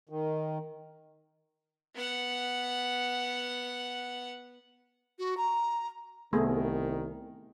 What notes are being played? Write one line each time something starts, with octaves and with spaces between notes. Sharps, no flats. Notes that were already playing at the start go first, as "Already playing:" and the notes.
D#3
B3 F#5
F#4
A#5
C2 D#3 A3 B3 G#4